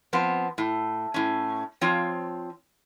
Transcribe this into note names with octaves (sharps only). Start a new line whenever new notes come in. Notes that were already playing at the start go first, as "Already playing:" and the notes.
F3 B3 C4
A2
A2 C#4
F3 C4 F4 C#5